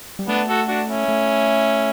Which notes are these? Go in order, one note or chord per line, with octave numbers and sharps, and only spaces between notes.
G3
A3 B3 D4
F#4 A4
D4 F#4
C#4 E4
A3